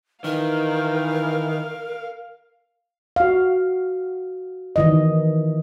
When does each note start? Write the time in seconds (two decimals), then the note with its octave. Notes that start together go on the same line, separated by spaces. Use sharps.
0.24 D#3 E3 A#4 F5
3.16 F#4 F5
4.76 D#3 E3 D#5